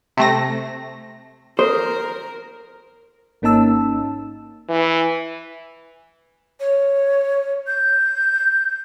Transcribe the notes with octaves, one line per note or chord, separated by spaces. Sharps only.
C3 A3 A#6
A4 A#4 C5
G#1 A#3 C#4 D#4 A5 E6
E3
C#5
G6